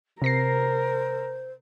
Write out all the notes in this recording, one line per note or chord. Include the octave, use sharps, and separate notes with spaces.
C3 A#4 C5 A#6 C7